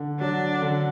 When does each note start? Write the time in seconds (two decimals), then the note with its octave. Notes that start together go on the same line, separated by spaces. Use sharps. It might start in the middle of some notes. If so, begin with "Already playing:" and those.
Already playing: D3
0.20 F#3 D4
0.62 D3